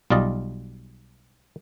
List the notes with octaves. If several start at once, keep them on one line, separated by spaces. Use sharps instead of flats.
B1 G3 F4 D5 D#5